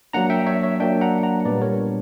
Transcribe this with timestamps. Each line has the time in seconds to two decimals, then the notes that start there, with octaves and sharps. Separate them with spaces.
0.13 F#3 A#3 D4 F#5 A#5
0.30 E5 G5
0.47 C#5 E5
0.63 C#5 E5
0.80 F#3 A#3 D4 E5 G5
1.01 F#5 A#5
1.23 F#5 A#5
1.45 A#2 G3 B3 D4 B4 D5
1.62 A#4 C#5